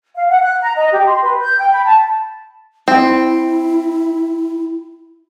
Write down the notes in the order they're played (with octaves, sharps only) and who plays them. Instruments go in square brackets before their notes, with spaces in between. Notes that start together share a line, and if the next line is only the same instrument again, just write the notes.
[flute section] F5
F#5
F#6
A#5
D#5
G4
C6
B4
G6
G5
B5
A5
[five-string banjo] C4 [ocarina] E4